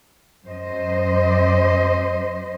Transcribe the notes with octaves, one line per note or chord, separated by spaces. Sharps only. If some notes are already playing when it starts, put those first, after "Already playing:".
F#2 C5 D#5